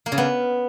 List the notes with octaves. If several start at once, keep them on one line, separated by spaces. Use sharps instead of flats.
A#3
C#3
B3